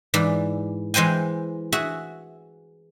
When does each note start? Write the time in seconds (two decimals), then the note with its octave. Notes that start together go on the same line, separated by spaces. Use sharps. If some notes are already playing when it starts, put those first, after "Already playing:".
0.14 G#2 E3 D5
0.94 E3 G#3 C5 G5 G#5
1.72 F#4 G#4 E5